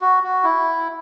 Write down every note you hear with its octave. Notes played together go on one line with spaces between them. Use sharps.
F#4
F#4
E4